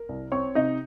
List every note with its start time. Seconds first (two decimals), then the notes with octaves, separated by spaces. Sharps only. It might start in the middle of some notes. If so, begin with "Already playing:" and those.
Already playing: A#4
0.09 C2
0.32 C4 C#5 C#6
0.55 C3 D#4 D#5